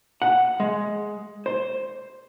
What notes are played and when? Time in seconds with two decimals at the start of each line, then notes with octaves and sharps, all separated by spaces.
0.22 F#5
0.60 G#3
1.46 C5